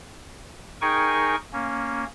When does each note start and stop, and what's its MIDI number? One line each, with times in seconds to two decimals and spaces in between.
0.81 1.36 63
0.81 1.36 68
0.81 1.36 70
0.81 1.36 79
0.81 1.36 80
0.81 1.36 85
1.53 2.05 58
1.53 2.05 61